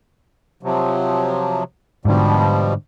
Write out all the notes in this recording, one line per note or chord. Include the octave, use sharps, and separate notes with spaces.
C3 F3 F#3
G#2 B2 D3 F3 G3